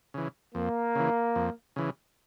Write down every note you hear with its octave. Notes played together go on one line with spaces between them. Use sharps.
C#3 E3
F2 A#3
C#3 E3
F2
C#3 E3